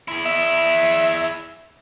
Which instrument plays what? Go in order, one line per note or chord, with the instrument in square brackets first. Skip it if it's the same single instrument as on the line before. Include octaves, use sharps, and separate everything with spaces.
[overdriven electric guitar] E4 G#4
[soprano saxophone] E5